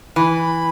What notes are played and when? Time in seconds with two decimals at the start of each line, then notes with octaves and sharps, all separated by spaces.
0.16 E3 B5